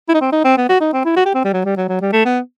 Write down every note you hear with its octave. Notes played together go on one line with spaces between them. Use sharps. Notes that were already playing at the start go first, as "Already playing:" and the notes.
E4
D#4
C4
D#4
C4
B3
F#4
D#4
C4
E4
F#4
G4
C4
G3
F#3
G3
F#3
F#3
G3
A3
B3